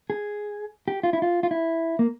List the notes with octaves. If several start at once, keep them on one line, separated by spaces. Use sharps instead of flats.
G#4
G4
F4
E4
F4
F4
E4
A#3